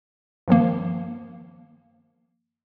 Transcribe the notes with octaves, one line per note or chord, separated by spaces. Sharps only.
G2 D#3 F3 A#3